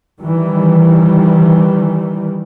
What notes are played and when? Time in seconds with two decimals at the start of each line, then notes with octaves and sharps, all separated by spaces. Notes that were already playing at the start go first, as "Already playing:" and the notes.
0.21 D#3 E3 G3